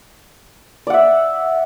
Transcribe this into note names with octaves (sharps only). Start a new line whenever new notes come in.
D5 E5 F#5